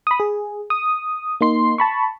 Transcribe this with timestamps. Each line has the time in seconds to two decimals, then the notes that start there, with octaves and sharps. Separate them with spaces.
0.07 B5 D#6
0.20 G#4
0.70 D#6
1.41 A#3 D#4 C6 C7
1.78 A5 B5 C#6